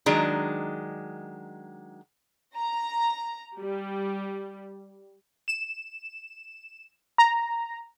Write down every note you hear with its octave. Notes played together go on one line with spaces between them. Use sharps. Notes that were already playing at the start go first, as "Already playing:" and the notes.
D#3 F#3 G#3 D4 A#5
A#5
G3
E7
A#5